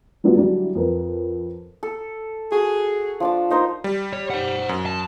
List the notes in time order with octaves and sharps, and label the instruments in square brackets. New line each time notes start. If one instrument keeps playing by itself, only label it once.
[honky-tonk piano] F3 G3 B3 D4 F4 F#4
D3 F#3 G3 D4 E4
F2 A#4 B4
[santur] A4
[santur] F#4 [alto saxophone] G#4
[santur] F3 D4 D6
[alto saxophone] D#4 [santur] A#4 C5 D#5
[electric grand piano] G3
[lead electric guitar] C#5
C5 F#5
[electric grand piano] F#2
[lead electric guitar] A5